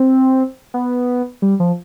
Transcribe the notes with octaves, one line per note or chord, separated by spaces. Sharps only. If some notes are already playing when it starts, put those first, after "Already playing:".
Already playing: C4
B3
G3
F3